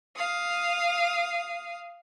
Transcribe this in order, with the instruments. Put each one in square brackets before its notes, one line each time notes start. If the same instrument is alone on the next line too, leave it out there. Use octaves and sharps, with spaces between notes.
[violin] F5 D#6